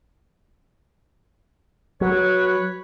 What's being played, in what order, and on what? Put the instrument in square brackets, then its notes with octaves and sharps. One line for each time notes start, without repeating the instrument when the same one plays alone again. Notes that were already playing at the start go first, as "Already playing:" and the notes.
[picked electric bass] F#3 [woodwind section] B4 C#5